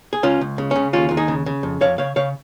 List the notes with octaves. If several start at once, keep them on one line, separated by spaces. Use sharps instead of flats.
G#4
C#2 C#4 F4
C#2
C#3
C#3 C#4
D#2 C#4 F4
D#2 F4
D#4 G#4
C#3
C#3
F2
F2 C#5 F5
C#3 C#5 F5
C#3 C#5 F5